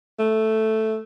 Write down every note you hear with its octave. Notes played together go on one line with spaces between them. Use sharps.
A3